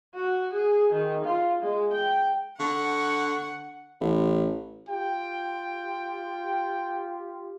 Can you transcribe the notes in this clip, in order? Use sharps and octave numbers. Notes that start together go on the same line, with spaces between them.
F#4
G#4
D#3
F4
G#3
G5
D3 F#5 C#6 F#6
A1
F4 G4 G5